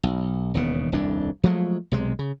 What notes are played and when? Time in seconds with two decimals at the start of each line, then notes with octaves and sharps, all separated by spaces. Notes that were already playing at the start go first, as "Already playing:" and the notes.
0.03 B1
0.54 E1 D#2 C#3 B3
0.92 D#1 C2 F2 D4
1.43 F3 F#3 G#3 A3
1.92 B1 C3 G#3
2.19 C#3